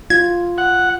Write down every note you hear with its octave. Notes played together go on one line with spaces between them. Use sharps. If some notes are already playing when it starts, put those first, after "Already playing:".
F4 G#6
F#5